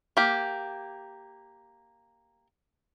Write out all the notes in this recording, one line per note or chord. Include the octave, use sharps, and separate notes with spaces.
A#3 G4